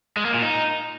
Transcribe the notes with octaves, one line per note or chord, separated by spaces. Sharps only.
G#3
A#3
A#2
D#4